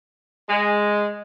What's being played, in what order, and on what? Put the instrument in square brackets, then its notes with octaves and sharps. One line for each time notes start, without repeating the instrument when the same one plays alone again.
[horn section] G#3